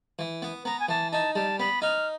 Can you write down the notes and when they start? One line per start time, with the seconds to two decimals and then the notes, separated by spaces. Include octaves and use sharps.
0.19 E3
0.42 B3
0.65 B3 A#5
0.80 G#5
0.89 E3 A5
1.12 D#4 A5
1.35 G3 A5
1.59 B3 B5
1.82 D#4 F6